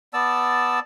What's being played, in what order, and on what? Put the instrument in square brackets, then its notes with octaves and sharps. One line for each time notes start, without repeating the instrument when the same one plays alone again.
[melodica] B3 D5 A5 E6